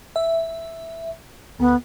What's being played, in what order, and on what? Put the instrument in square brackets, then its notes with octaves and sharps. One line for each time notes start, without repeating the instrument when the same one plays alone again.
[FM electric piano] E5
[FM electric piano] D2 [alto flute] B3